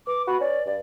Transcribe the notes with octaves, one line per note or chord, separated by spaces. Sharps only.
B4 D6
F#4 B5
C#4 D5
G2 D5